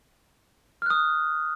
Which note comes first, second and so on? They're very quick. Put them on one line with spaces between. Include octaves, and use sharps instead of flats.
F6 F#6 D#6